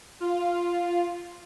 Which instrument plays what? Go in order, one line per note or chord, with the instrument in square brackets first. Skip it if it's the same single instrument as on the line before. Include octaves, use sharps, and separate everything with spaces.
[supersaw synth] F4